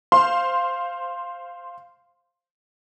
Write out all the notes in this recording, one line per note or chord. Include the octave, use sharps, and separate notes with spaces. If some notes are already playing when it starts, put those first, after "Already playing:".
C5 F5 C6